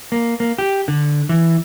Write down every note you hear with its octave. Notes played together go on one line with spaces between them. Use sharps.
A#3
A#3
G4
D3
E3